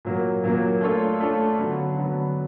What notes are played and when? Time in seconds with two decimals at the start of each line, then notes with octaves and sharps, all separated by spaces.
0.05 A#2 F#3 A#3
0.44 A#2 F#3 A#3
0.81 A3 D4 F4 A4 C#5
1.20 A3 D4 F4 A4 C#5
1.59 D3 F#3 B3
1.96 D3 F#3 B3